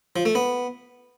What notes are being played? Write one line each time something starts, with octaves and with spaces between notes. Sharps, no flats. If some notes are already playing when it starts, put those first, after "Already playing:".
F3
A3
B3